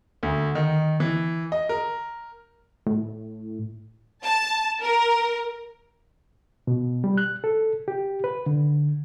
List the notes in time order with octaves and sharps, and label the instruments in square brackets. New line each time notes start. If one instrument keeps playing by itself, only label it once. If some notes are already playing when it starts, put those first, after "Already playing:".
[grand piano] D2
D#3
E3
D#5
A#4
[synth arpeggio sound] A2
[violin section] A5
A#4
[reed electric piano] B2
G3
F#6
A4
G4
B4
D3